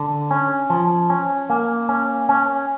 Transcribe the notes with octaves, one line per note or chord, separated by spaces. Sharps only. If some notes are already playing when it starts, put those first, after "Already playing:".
Already playing: D3
C#4
F3
C#4
A#3
C#4
C#4